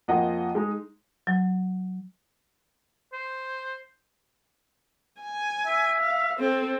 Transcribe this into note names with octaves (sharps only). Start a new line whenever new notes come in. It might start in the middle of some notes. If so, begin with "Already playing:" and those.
F2 A#3 F4 D#5 F#5
G#3 D#4
F#3
C5
G#5
E5
F5
C4 A4